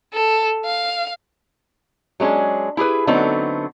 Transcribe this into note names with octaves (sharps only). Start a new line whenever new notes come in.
A4
F5
F#3 G#3 C#4 D4 G#4
E4 G4 G#4 B4
D3 F#3 A3 B3 C4 D#4